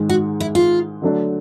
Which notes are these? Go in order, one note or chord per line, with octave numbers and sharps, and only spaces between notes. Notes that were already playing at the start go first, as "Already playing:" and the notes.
Already playing: G#2 D#3 G#3
F#4
E4
F4
D3 F#3 A3 D4